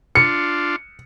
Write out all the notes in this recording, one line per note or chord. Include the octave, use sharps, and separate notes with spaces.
D4 F4 C#7